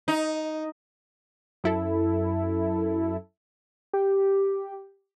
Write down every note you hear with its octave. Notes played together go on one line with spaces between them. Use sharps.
D#4
F#2 E4 A4
G4